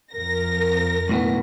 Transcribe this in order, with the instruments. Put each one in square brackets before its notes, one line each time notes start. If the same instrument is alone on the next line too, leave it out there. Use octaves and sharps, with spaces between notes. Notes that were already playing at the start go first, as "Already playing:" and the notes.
[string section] F2 A#4 A#6
[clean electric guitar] B1 A2 B3